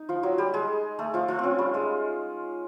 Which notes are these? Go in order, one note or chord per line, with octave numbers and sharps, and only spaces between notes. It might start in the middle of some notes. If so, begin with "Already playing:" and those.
Already playing: D#4
F3 F4
F#3 F#4
G3 G4
G#3 G#4
A3 A4
F3 F4
F3 F4
C4 C#4
G3
G#3